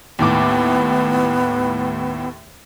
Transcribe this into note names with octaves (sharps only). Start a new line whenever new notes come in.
D#2 A2 B3 D6